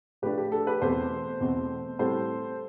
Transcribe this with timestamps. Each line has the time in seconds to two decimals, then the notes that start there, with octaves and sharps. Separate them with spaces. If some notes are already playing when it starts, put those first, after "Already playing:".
0.22 A2 F3 A3 D4 G4 B4
0.38 G4
0.52 A4
0.67 G4 B4
0.81 E2 B2 A3 C4 A4 C5
1.40 E2 B2 A3 C4
1.99 A2 G3 C4 E4 A4 C5